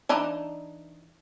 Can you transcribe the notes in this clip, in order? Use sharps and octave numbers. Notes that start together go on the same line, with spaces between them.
E3 D4 D#4